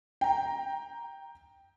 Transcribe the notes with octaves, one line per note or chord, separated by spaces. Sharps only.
G5 A#5